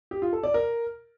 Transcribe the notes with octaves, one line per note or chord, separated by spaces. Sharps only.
G4
F4
A4
D5
A#4